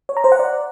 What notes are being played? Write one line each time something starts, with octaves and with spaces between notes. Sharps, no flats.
C#5
A#5
C5
F#5
D5